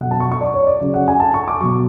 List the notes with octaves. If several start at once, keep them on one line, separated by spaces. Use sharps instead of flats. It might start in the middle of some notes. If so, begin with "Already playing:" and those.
B2 F#3 F#5
A5
C#6
C#6
D5
C#5
D5
C#3 F#3
F#5
G#5
A5
C#6
D6
B2 F#3 C#6